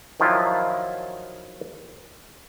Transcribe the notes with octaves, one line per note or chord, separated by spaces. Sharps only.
D#3 F3 F#3 E4 F4